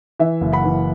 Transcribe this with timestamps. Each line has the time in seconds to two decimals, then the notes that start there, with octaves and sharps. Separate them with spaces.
0.20 E3 E5
0.41 F#1
0.52 F#5 B5
0.64 E3